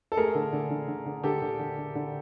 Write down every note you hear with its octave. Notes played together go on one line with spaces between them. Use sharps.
A4
A3 G#4 A#4
D3
D3
D3
D3
D3
D3 G4 A4
D3
D3
D3
D3